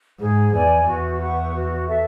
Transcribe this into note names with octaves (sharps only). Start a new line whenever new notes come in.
G#2 G#4
E2 D5 G#5
E2 F#4
B4 F#5 C#6
F#4
A4 E5